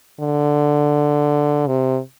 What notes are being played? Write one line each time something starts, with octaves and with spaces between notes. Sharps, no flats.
D3
C3